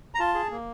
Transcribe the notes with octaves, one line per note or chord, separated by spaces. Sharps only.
A#5
F4 A5
G#4
A#3